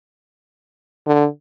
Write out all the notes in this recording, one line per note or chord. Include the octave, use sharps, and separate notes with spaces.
D3